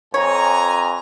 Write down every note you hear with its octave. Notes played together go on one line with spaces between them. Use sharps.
F2 C#5 G#5 A#5